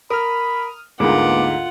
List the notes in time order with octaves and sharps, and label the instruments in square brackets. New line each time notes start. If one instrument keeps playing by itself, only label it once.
[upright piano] A#4 [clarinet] B5 [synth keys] D#6 F6
[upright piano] D2 G#2 [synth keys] G#3 A#3 B3 [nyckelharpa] F4 F#5 [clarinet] D6